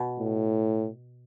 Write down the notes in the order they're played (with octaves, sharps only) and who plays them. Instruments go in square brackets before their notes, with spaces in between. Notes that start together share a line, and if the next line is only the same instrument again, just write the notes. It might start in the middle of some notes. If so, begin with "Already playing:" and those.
Already playing: [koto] B2
[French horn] A2